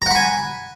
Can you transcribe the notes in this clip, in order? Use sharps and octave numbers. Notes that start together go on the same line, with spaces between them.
F#5 G#5 A#5 B5